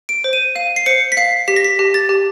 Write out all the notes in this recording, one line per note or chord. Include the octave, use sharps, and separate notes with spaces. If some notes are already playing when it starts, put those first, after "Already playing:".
D7
C5
D#7
F5 D#7
C7
C5 C#7
B6
F5 C7
G4 B6
A#6
B6
G4
A6
G4